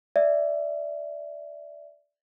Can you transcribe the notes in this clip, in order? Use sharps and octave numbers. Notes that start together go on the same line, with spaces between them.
D5 E5